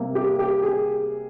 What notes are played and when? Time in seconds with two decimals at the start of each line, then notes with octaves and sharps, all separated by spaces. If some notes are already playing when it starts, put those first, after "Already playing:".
Already playing: C3 G3 A#3
0.15 G4
0.39 G4
0.62 G#4